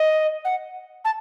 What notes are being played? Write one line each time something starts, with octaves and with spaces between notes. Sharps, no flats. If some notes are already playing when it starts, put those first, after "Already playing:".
Already playing: D#5
F#5
A5